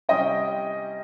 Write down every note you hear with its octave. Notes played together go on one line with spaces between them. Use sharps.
C3 G3 C#4 D#5 G5